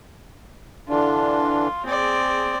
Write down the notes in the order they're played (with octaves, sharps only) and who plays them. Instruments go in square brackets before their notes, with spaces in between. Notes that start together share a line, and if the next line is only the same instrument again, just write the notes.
[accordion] D3 E3 D4 [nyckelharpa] F4
[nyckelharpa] C4 D5 [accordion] G#4